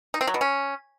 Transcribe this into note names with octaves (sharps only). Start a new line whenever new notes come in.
D#4
C4
F#3
B2
C#4